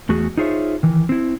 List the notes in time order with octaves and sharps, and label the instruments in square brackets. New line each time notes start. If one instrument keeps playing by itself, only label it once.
[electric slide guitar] E2 A3 F#4 G#4
D#4 F4 G#4 C5 C#5 E5
D#3 E3
C4 E4